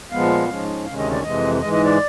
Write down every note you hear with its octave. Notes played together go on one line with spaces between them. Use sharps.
A#2 F3 G#3 B3 F5
G#2 F3 G#3 C#4
D2 C3 D#3 G#3 C#4 F5
D#5
D5
F2 C3 E3 G#3 D#5
G#2 E3 G#3 D#5
D#5
D5